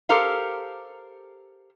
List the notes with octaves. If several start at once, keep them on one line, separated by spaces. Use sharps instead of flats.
G4 A4 A#4 C5 F5